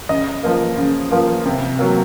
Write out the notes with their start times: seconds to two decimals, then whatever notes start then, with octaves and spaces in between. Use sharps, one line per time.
0.09 C#3 D#5
0.43 F3 A#3
0.77 C#3
1.11 F3 A#3
1.46 C3
1.79 F#3 A#3